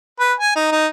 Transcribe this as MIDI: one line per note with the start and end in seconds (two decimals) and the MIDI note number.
0.20 0.33 71
0.40 0.54 80
0.55 0.72 63
0.72 0.87 63